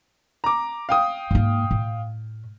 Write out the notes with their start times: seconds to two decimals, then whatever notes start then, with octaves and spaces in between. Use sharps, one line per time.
0.44 A#5 D6
0.89 F5 G5 D#6
1.31 G#2 A#3
1.71 A2